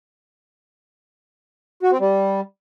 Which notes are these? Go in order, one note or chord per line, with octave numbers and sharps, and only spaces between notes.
F#4
C4
G3